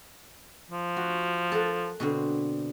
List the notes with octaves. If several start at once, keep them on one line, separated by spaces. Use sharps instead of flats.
F3
F#4
A4 A#4 F#5
B2 D3 C4